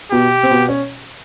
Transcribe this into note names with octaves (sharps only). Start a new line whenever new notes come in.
B2 B3 G4
C4
B2 B3
C#4